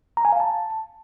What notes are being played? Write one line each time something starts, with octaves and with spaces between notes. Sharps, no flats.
A#5
G#5
F5
A5